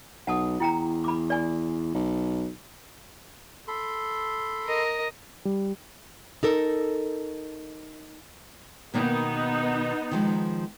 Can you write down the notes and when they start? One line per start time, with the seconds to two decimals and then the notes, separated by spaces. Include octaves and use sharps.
0.27 B1 F#5 A5 D#6
0.60 E2 E4 G5 A#5
1.04 B5 D6
1.30 D5 G#5
1.95 B1
3.68 A4 B5 C6
4.65 A#4 D#5
5.45 G3
6.43 D#4 A4 A#4
8.94 B2 D#3 A#3 B3 D#4
10.11 D#3 F3 G#3